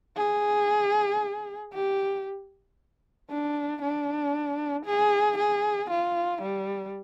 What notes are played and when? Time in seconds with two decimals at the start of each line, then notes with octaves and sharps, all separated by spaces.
0.17 G#4
1.73 G4
3.30 D4
3.82 D4
4.86 G#4
5.38 G#4
5.90 F4
6.42 G3